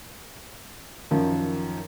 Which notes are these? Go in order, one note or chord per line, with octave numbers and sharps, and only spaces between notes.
F#2 D#3 F3